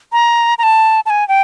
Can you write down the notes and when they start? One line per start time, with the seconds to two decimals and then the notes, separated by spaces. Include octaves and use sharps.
0.12 A#5
0.58 A#5
0.63 A5
1.06 A5
1.10 G#5
1.28 G5